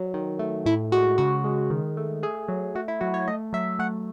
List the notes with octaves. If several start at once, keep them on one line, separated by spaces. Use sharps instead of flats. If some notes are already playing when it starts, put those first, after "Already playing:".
Already playing: F#3
D#3
A3
A2 E4
G#3 F#4
C#3 F#4
G#3
D#3
A3
A3 G#4
F#3
A3 F#4
E4
F#3 F#4
C#5
A3 D#5
F#3 E5
A3 F#5